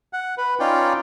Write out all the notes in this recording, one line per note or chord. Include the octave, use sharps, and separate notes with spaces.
F#5
B4
C#4 D#4 F4 D5 G5